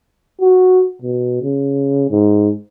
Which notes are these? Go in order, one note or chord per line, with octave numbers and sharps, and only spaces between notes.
F#4
B2
C#3
G#2